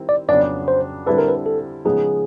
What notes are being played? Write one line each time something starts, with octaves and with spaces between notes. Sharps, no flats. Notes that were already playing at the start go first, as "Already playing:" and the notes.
Already playing: D#3 G3 C4 E4
D5
F2 C#3 F#3 B3 D4 D5
C5
D3 G3 C4 E4 A4 B4
A#4
B4
A4
C#3 F3 G#3 B3 D#4 G#4